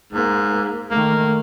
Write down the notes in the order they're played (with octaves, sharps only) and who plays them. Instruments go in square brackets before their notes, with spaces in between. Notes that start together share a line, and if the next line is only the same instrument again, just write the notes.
[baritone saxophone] G#2 [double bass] A#3
[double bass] D#3 A3 [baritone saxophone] A#3